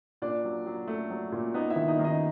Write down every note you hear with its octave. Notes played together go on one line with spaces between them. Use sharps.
A#2 D4 D5
F#3
F#3
A3
F#3
A#2
B3 D#4 D#5
E4 E5
D#3
D#4 D#5
D#3
D#4 D#5